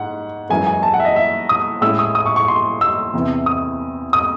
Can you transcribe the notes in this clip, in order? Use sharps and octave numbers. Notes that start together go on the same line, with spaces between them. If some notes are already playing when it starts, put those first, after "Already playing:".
Already playing: G#2 F#5
F#2 E3 G#3 G#5
G#5
A5
F#5
E5
D#5
E5
D#6
A2 G#3 C#4 E4 E6
D#6
D#6
C#6
C#6
C6
E6
E2 C3 E3
D#6
D#6